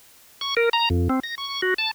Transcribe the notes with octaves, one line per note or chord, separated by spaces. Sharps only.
C#6
A#4
A#5
F2
C4
A#6
C#6
F#4
A5